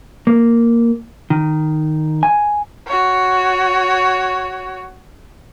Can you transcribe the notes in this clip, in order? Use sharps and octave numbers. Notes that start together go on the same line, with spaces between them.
A#3
D#3
G#5
F#4 C#5